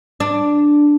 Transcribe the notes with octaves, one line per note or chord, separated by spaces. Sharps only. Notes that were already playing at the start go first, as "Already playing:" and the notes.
D4